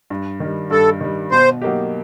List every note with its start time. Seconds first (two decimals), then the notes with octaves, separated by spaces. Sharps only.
0.10 G2
0.40 D#3 G3
0.70 G2 A4
1.01 D#3 G3
1.31 B2 C5
1.62 F#3 A#3 D#4 G4